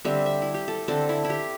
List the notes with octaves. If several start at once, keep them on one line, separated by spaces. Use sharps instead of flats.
D3 G3 C4 E5
E5
E4
G4
A4
D3 C4 A4
E4
E4
G4